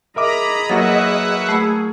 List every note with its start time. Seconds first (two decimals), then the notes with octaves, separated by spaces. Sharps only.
0.16 G#4 A#4 D#5 E5 A#5 B5 D6
0.70 F#3 A#3 F#4 B4 E5 F#5 A6
1.49 A3 G#4 B5 E6